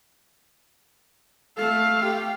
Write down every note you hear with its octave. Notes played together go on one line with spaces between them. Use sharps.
A3 A4 F5
F4 G4